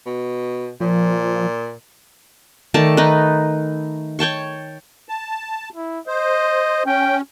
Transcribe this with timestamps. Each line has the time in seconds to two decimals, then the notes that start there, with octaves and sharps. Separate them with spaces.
0.06 B2
0.81 A#2 F3
2.74 D#3 A3 D5 A5
2.97 D#4 B4
4.19 C#5 G5 A5 C#6
5.09 A5
5.75 E4
6.07 C5 D#5
6.86 C#4 G5